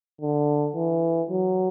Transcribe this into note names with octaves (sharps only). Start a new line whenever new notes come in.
D3
E3
F#3